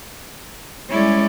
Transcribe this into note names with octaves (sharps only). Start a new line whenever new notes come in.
G3 G#3 C#4 E4 D5